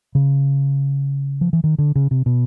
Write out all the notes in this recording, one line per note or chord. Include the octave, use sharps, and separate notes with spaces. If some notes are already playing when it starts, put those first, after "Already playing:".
C#3
F3
E3
D#3
D3
C#3
C3
B2